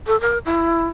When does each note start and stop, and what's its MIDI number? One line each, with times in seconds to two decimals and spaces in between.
0.07 0.20 69
0.21 0.38 70
0.45 0.87 64